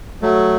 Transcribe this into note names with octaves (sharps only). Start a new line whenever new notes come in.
F#3 A3